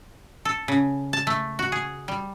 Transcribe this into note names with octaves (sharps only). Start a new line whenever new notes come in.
A4
C#3
A5
A3
F#4
G#4
G3